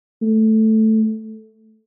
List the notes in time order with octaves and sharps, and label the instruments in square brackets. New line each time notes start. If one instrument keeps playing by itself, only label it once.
[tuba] A3